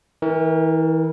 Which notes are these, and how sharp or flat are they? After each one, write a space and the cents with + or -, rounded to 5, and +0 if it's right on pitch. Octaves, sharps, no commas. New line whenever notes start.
E3 -35 A#4 +0